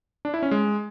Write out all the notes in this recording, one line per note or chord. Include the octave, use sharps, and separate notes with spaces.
D4
E4
C#4
G#3